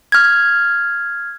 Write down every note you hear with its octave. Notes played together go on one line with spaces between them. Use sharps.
F6 G#6